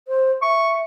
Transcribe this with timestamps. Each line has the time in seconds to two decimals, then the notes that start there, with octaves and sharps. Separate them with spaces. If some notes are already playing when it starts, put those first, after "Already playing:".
0.07 C5
0.42 E5 C#6